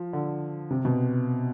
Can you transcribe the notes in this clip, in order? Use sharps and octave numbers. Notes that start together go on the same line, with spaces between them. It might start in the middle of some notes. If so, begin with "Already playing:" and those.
Already playing: F3
D3
C3
B2